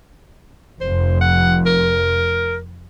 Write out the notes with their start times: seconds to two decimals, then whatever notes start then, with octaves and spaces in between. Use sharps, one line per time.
0.81 F1 F2 C5
1.21 F#5
1.66 A#4